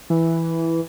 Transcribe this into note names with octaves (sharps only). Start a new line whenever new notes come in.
E3